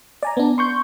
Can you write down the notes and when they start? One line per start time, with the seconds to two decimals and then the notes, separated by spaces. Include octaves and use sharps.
0.23 D5 G#5 A#5
0.37 B3 D4
0.58 C6 C#6 G6